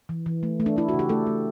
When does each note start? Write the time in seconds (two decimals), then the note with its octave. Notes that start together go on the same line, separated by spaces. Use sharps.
0.09 E3
0.26 E3
0.43 A3
0.60 A3
0.66 D4
0.76 A3 E4
0.89 C#3 F#4
0.99 G4
1.09 A3 A4
1.27 A3